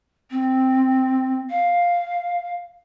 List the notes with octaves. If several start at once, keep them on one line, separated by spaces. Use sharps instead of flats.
C4
F5